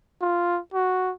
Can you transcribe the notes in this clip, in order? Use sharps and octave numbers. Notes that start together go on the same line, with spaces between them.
F4
F#4